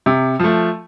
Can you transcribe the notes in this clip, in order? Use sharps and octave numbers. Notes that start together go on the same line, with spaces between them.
C3
F3 A3